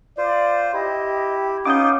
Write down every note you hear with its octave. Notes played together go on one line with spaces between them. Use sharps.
F4 C5 D5
E4 G4 D#5
B3 C#4 D#4 F4 D6 D#6 G6